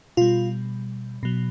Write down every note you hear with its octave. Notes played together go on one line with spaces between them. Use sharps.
B2 G3 F4
B2 F#3